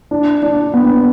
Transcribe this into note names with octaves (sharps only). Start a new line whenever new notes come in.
D4
D4
B3